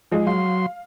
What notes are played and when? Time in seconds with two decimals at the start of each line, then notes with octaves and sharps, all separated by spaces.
0.12 F3 G#3 G#4
0.27 F#3 F5 C6